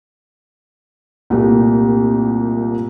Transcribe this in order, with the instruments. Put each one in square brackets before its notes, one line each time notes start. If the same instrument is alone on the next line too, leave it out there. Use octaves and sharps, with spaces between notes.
[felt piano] C2 A#2 A3